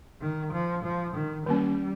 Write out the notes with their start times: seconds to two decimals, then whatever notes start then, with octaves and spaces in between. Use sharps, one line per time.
0.21 D#3
0.53 F3
0.84 F3
1.15 D#3
1.46 D#3 G3 A#3 C#4